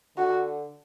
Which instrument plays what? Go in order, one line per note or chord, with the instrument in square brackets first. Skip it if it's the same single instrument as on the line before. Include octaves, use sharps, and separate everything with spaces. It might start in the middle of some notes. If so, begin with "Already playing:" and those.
[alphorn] D3 [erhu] F#4